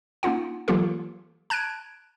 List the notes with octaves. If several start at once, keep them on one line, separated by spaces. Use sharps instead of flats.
A#3 C#4 D#4 F4 F#5
E3 F#3 A#3 F4 G4 A4
A5 F#6 G#6 D7